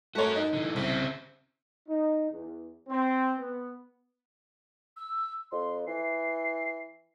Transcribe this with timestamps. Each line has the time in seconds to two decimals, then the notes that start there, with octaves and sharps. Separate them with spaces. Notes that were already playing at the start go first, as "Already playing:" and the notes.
0.15 A3 F#4 A#4 C#5
0.36 D#4
0.53 D3 E3
0.76 C2 C#3 C4
1.89 D#4
2.31 E2
2.89 C4
3.39 B3
4.97 E6
5.51 F2 C6
5.87 E3 C7